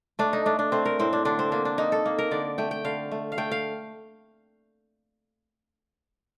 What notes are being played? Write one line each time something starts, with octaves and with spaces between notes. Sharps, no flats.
A3 D4
D#4
A3 D4
D4
A3 C4
A#4
A2 C4
D4
D3 D4
C4
A#3 D4
D4
A#3 D#4
A4
A#3
A#4
D3 D5
A3 G5
G5
D3 F5
A3
F5
A3 G5
F5